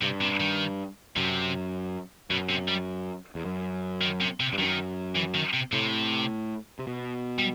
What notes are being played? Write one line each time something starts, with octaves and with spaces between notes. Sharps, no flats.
G2 C3
C3
D#3
F#2 C3
F#2 B2
C3
G3
E2
F#2
D#3
C3
C3
G2
F#2 D#3
E3
D#3
C3
A2 C3
C3
B2
G3